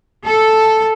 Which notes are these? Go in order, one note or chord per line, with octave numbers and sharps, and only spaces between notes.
A4